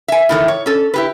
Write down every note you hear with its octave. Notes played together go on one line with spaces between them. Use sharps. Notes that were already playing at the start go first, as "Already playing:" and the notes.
E5 G#5
A2 D#3 E3 A3
C#5
C#4 A4
E4 G4 B4